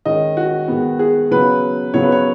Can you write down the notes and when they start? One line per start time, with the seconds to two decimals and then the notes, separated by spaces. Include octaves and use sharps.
0.05 D#3 G#3 C#4 D#5
0.37 F#4
0.68 D#3 G#3 B3
0.99 G#4
1.31 C#3 F#3 B3 B4
1.94 C#3 F#3 B3 C#5
2.03 B4
2.12 C#5